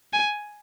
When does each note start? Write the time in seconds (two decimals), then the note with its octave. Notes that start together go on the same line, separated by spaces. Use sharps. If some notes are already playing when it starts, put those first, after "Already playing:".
0.13 G#5